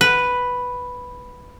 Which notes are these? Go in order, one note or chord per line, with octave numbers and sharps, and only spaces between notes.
B4